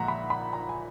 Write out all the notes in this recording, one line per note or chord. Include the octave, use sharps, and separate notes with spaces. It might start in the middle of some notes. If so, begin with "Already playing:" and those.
Already playing: A#1 A#2 G#3 E5 F#5 A#5
B5
B5
A#5
G#5